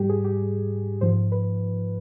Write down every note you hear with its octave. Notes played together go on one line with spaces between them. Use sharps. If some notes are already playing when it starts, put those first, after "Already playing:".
Already playing: G#2 G3 G4
G#4
G4
G#2 F3 C5
B4